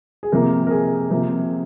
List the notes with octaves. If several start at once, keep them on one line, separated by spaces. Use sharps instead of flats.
G#4
C3 F3 A#3 A#4
A#4
G#4
C3 F3 A#3